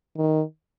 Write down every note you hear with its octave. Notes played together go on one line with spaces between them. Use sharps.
D#3